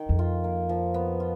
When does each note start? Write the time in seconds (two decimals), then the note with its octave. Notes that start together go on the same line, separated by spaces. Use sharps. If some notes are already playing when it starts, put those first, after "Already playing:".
Already playing: D#3
0.09 F2
0.19 F4
0.44 A#3
0.69 F3
0.94 B3
1.20 F4